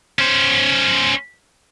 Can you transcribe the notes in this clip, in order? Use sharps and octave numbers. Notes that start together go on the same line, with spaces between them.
C#4 C5